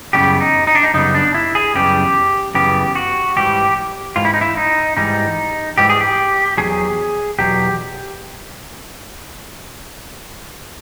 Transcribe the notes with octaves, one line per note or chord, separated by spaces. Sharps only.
F#2 C#3 E3 G3 B3 G4
D#4
D#4
D4
D#4
F#2 C#3 G3 B3 D#4
D4
E4
G#4
F#2 C#3 E3 G3 B3 G4
F#2 C#3 E3 G3 B3 G4
F#4
G#2 E3 G3 G4
G#2 E3 F4
E4
D#4
E4
D#4
G#2 E3 G3 D#4
G#2 E3 G3 G4
G#4
G4
E2 B2 F#3 G#4
E2 B2 F#3 G4